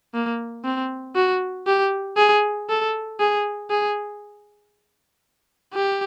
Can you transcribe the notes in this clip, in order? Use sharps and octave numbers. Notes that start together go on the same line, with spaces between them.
A#3
C4
F#4
G4
G#4
A4
G#4
G#4
G4